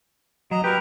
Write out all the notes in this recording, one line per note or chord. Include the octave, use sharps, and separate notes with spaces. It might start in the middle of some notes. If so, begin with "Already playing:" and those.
F#3 D#5 A#5
G4 A#4 B4